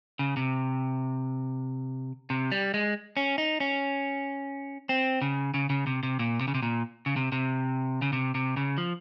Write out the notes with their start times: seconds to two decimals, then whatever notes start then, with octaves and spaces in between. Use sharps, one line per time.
0.19 C#3
0.37 C3
2.30 C3
2.51 G3
2.74 G#3
3.17 C#4
3.38 D#4
3.60 C#4
4.89 C4
5.22 C#3
5.54 C#3
5.70 C#3
5.87 C3
6.03 C3
6.19 A#2
6.41 C3
6.48 C#3
6.55 C3
6.63 A#2
7.06 C#3
7.16 C3
7.32 C3
8.02 C#3
8.13 C3
8.35 C3
8.57 C#3
8.78 F3